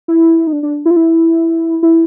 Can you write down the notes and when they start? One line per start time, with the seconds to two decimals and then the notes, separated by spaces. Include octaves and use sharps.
0.08 E4
0.47 D#4
0.53 D4
0.63 D4
0.86 E4
0.91 F4
0.96 E4
1.83 E4